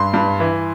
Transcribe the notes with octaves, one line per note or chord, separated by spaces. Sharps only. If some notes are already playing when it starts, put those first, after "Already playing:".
Already playing: G2 C6
G2
E3